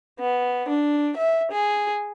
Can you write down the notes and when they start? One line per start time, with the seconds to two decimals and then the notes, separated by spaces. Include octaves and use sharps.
0.20 B3
0.69 D4
1.16 E5
1.51 G#4